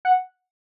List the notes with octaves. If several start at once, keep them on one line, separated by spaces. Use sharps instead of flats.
F#5